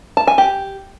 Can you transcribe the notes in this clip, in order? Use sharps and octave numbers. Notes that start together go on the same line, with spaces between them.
A5
G#5
G4